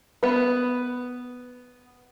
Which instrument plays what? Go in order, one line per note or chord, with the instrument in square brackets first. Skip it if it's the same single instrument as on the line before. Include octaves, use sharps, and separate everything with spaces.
[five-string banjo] B3 B4